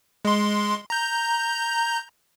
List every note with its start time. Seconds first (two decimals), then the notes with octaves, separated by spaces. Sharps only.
0.25 G#3 C6
0.90 A#5 G6